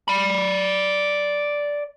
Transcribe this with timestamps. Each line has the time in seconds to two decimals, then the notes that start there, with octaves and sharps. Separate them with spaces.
0.08 D5 B5